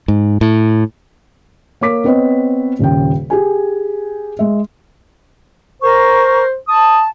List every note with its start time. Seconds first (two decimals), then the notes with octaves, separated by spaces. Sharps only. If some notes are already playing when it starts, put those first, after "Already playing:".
0.08 G#2
0.41 A2
1.81 A#3 C#5 D6 B6
2.04 B3 C4 B4 C#5 D#5
2.79 D#1 C#3 G5
3.30 G4 G#4 G#5
4.39 G#3 E5
5.82 A#4 C5 C#6
6.68 A5 D#6